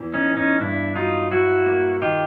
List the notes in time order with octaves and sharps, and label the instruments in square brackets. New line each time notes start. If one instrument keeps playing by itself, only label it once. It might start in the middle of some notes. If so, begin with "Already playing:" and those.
Already playing: [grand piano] E2 E3
[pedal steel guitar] C#4 D#4
[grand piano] E2
[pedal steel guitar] C#4 D#4
[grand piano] G2 [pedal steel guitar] D4 E4
[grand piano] F#3 [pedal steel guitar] D#4 F4
[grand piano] F#3 [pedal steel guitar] E4 F#4
[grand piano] A#3
[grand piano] D#3 [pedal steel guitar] F4 G4